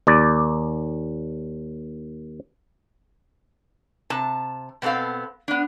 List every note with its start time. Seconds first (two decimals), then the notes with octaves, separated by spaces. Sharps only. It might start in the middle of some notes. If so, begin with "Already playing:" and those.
0.07 D#2 D5
4.10 C3 A5
4.82 B2 B3 C4 A4 F5
5.48 B3 D4